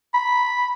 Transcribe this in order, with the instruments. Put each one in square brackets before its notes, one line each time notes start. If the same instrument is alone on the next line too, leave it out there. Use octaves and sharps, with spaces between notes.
[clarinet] B5